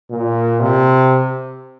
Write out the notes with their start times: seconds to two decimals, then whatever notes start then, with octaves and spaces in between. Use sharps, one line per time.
0.10 A#2
0.60 C3